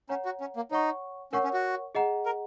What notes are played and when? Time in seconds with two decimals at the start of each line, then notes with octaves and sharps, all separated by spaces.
0.09 C#4 C#5 F#5 A#5
0.25 F#4
0.41 C#4
0.56 A#3
0.71 D#4 C#5 F#5 C#6
1.33 C#4 A#4 C#5 F#5 C#6
1.44 C#4
1.53 F#4
1.95 G#4 D#5 F#5 A#5
2.26 A#4